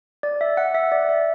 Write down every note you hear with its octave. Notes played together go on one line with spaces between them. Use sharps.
D5
E5
F#5
E5
D5
E5